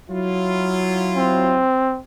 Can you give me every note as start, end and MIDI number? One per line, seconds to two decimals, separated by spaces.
0.10 1.62 54
0.10 1.62 64
0.10 1.62 65
1.17 2.00 60